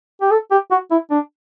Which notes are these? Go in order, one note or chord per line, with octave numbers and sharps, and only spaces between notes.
G4
A4
G4
F#4
E4
D4